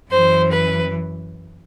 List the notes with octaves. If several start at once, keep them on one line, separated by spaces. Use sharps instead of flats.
F#2 E3 C5
B4